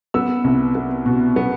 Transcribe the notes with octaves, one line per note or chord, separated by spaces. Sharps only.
B3 E6
C2
B3
B2
B3